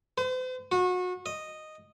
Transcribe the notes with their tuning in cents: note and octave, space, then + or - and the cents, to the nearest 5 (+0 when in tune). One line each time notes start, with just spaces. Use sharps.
C5 -45
F#4 -30
D#5 -5